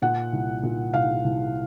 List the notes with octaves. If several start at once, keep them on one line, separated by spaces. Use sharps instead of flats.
A#2 F#5
C2
A#2
C2 F5
C2